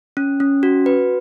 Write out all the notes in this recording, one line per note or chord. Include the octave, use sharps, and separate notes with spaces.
C#4
C#4
F#4
B4